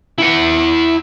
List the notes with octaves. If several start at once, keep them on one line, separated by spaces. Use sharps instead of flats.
E4 F#5